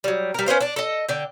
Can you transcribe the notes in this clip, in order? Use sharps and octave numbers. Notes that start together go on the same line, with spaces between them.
F#3 G3
G3 A#4
C#4 B4 C5 F5
D4 D5
A4 D#5
D3 G5